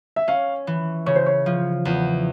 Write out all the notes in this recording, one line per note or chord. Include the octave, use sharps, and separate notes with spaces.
E5
C#4 F5
E3
C#3 C#5
C5
C#5
F3
E2